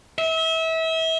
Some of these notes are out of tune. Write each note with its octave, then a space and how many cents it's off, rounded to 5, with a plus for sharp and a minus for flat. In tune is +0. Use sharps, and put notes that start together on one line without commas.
E5 -30